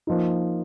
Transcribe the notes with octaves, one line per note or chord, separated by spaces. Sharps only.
F3 A#3 D#4